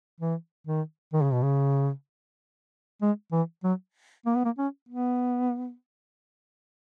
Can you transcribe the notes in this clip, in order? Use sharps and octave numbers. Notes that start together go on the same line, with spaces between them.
E3
D#3
D#3
C#3
B2
C#3
G#3
E3
F#3
A#3
B3
A#3
C#4
B3